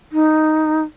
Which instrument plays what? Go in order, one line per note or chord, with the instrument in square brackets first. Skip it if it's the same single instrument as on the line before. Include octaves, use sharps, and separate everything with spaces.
[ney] D#4